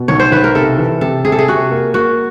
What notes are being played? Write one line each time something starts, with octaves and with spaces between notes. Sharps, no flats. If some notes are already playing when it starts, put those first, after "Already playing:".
Already playing: B2
B1 C#5
C5
B1 B4
A#4
C3 A4
E3
C3 A4
C3 G#4
A4
G#4
C3 F#4
A#3
A#3 F#4